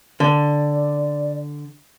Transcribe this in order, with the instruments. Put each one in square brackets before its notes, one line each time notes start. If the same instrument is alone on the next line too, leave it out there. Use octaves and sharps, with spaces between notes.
[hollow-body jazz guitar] D3 [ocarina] D5